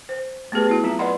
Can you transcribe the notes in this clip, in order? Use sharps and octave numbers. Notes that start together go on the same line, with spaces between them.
C5
A3 B3 G4 G#4 B4
B3 E4 F#4
F#3 C4 F4
B4 D5 D#5 F#5 B5 C6